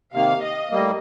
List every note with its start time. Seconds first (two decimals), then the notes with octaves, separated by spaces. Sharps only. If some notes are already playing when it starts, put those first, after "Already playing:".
0.14 C3 D#3 A#3 F5
0.42 D#5
0.71 A2 G3 A#3